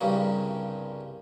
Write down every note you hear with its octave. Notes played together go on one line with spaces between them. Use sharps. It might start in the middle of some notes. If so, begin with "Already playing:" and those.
C2 G2 C#3 A#3